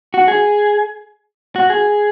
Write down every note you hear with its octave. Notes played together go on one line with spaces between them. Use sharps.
F#4
G#4
F#4
G#4